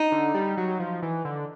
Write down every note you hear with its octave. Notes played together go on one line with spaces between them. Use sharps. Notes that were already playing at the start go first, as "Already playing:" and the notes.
Already playing: D#4
D3
G3
F#3
F3
E3
D3